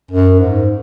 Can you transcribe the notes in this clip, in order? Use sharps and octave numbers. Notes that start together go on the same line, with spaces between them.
F#2
G#2